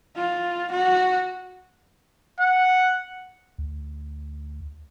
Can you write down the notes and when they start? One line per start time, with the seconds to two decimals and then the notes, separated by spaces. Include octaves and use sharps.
0.16 F4
0.72 F#4
2.40 F#5
3.58 D2